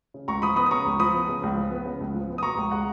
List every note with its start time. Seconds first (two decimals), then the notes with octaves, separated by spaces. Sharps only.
0.14 C#3
0.28 C#2 A#5 C#6
0.42 F3 B5 D#6
0.56 B3 B5 D#6
0.66 D#6
0.71 C#3 A#5 C#6
0.86 C#2
0.99 F3 B5 D#6
1.14 B3
1.28 C#3
1.43 C#2
1.57 F3
1.71 B3
1.86 C#3
2.00 C#2
2.14 F3
2.29 B3
2.38 D#6
2.43 B2 A#5 C#6
2.57 C#2
2.72 G#3 F#5 A#5